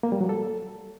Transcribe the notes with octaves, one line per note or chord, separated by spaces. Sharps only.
A#3
G3
F#3
A4